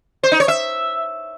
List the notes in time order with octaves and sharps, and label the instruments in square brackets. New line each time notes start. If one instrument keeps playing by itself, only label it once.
[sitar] C5
D#4
C#5
E5